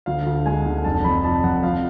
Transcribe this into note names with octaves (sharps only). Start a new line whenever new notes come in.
D2 F5
D2
G#3 G#5
D3
F1 A5
F2 B5
F2 A5
F2 F#5
F3 F5